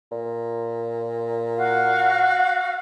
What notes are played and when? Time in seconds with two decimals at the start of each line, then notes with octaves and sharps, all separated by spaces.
0.12 A#2
1.57 F#4 F5